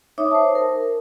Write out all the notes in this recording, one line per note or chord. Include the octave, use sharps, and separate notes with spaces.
D#4 C#5 E5 D6 D#6
C5 A5
A#4